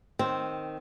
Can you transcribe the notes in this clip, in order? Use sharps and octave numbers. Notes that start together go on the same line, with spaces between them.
D#3 C4